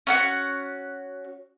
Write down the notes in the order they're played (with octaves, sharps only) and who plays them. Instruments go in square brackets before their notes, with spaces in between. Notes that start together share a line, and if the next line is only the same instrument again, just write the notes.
[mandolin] C#4 F#4 F#5